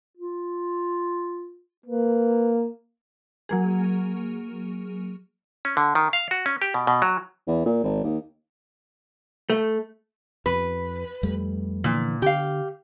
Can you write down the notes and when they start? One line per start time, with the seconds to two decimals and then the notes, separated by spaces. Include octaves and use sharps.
0.17 F4
1.86 A#3 B4
3.49 F#3 A#3 G#4
5.65 C#4
5.77 D3
5.95 D#3
6.13 F5
6.31 F#4
6.46 C#4
6.62 G4
6.74 B2
6.87 B2
7.02 F#3
7.47 E2
7.66 A#2
7.84 G#1
8.04 D#2
9.50 A3
10.46 F2 B4
11.23 F2 G3 A3
11.84 A#2 D3 E3 F3
12.22 D3 G4 F5